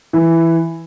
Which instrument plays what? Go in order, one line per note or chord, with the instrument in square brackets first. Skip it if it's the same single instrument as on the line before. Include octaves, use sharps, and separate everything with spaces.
[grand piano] E3